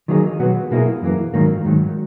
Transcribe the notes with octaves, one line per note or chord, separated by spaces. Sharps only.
D#3 F#3 A#3 D#4 G#4
B2 F#3 B3 F#4
B2 A#3 E4 G#4
F#2 E3 A#3
G#2 D#3 F#3 A#3
G#2 D#3 F#3